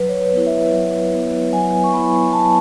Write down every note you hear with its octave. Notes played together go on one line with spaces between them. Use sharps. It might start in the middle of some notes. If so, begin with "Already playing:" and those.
Already playing: F#3 B4
C#5
B4
B3 E4
E5
F#3 E5
B3 E4
F#3 G#5
C#6
B3 E4 B5
F#3 A5